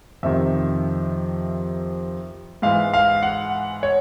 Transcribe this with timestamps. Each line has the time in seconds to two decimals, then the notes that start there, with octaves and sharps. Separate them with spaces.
0.23 F2 C3 D#3 E5
2.62 G#2 E3 F5
2.93 F5
3.23 F#5
3.83 C#5